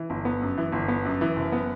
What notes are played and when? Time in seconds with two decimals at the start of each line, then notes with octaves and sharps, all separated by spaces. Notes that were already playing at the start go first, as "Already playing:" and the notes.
Already playing: E3
0.10 G1
0.25 B3
0.42 F#2
0.58 E3
0.72 G1
0.88 B3
1.05 F#2
1.21 E3
1.36 F#1
1.52 B3